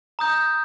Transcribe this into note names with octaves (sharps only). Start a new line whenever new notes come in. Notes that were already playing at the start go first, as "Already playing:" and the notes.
A#5 D#6 G6